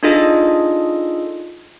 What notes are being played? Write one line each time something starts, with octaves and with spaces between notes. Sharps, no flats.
D4 D#4 F4 G#4 A4 D#5